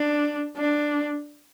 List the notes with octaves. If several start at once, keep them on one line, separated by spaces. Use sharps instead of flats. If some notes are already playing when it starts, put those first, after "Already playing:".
Already playing: D4
D4